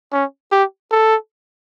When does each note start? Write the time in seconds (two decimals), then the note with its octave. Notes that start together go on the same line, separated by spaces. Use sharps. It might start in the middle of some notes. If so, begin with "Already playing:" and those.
0.13 C#4
0.52 G4
0.91 A4